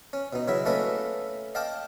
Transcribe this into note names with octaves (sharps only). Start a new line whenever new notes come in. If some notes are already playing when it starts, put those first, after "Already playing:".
C#4
B2 D#4
C#3 F#3 E4 E5
A3 A#3 C#4 A4 B4 D#5
D#5 F5 G5 A5 D6